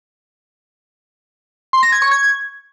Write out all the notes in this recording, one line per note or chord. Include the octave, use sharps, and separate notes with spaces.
C6
A#6
G#6
C#6
G#6